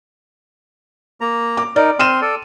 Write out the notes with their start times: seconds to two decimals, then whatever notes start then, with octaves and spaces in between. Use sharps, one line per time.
1.21 A#3 A#5
1.57 D6
1.76 D#4 A#4 D5
1.99 C4 C6 F6 D#7 E7
2.22 A4 D5